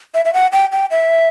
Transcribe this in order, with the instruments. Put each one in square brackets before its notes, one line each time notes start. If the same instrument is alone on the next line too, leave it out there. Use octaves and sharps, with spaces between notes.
[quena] E5
E5
F#5
G5
G5
E5